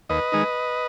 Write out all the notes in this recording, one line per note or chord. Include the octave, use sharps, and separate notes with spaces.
D#2 B4 D#5
D#3 G#3 D#4